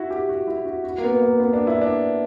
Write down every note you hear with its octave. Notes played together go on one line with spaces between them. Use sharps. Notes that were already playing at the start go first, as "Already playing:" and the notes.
Already playing: E4 F#4
G4
F#4
E4
F#4
F#4
A#3
B3
A#3
B3
D4
E4
D4